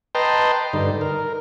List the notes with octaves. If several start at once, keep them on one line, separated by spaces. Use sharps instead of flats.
B4 D#5 G5 A5 A#5 C6
G2 D3 D#4
A#4